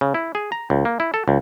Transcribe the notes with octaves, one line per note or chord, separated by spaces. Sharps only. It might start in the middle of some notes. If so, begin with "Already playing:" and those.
C#3
E4
G#4
A#5
C#2
A#3
E4
A4
C#2